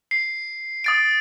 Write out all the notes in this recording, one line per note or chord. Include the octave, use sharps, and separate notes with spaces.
C7
D#6 A6 D7